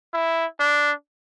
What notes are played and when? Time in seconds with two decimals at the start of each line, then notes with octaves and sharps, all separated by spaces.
0.14 E4
0.60 D4